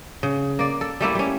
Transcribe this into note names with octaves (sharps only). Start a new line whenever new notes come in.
C#3
A#3 D5
A4
G3 A3 A#3 E4
G3 C#4